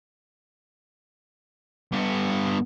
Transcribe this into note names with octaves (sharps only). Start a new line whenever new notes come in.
G2 B3